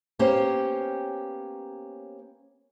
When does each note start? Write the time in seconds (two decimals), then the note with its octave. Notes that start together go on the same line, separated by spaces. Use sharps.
0.19 A#3 B3 C#4 G4 C5 C#5